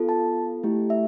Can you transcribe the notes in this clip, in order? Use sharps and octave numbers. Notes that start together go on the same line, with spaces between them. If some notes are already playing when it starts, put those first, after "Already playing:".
Already playing: B3 F4 A4
A5
A3 E4 G4
E5